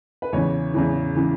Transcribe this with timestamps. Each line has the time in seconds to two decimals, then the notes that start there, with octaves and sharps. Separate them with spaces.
0.22 B4
0.33 E2 C#3 E3 C#5
0.74 E2 C#3 E3
1.15 C#3 E3